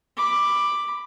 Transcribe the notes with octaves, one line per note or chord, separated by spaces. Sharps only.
B5 D6